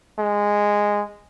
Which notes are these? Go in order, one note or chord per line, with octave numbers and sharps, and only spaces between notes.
G#3